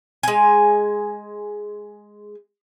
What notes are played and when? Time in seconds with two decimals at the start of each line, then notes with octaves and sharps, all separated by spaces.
0.23 G#3 G#5